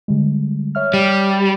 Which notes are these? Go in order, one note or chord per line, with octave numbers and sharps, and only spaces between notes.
D3 G3 G#3
C#5 E5 F6
G3